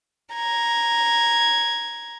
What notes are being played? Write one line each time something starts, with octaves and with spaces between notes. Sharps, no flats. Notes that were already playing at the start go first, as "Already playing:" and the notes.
A#5 G#6